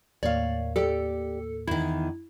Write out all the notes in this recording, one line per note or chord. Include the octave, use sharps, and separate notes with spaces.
D#2 A2 A#3 C#5 D5 F5
G4 A4 D5
E2 D#3 E4